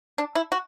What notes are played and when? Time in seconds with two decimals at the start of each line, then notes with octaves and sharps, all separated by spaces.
0.18 D4
0.35 E4
0.52 F#4